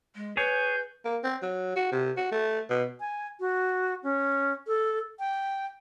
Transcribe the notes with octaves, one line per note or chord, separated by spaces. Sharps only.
G#3
G#4 B4 C#5 G6
A#3
C4
F#3
F#4
C3
F#4
A3
B2
G#5
F#4
C#4
A4
G5